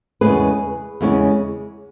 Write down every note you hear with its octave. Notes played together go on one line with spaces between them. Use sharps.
E2 C#3 G#3 C#4 G#4 B4
E2 C#3 G#3 C#4